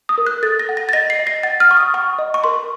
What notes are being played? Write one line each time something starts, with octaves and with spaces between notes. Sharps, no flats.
D#6
A#4
F#6
A4 A6
A#6
F#5
A#6
A6
D#5 A#6
C7
D#5
A#6
F#5 A6
F6
F#5 C#6
D#6
F#5 C#6
D#5
C#6
A#4 C6